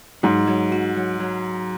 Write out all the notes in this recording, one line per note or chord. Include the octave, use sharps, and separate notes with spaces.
G#2 F#3
F#3
F#4
F#3
F#3